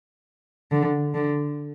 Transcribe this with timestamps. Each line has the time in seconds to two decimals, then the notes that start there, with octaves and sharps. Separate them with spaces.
0.71 D3
1.14 D3